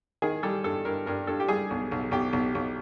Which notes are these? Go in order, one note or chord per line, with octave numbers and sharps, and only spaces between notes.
D#3 G#4
G3 A4
G2 A4
G2 A#4
G2 A#4
G2 A4
G4
G3 G#4
B1
B1
B1 G4
B1
B1